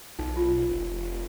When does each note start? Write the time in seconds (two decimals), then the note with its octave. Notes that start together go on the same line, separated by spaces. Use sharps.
0.19 B1 D#4
0.37 F4
0.69 F1